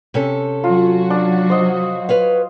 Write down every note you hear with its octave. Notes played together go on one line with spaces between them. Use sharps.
C3 C#4 A4
F#3 F4 F#4
D4
C5 D#5
B4 C#5 F5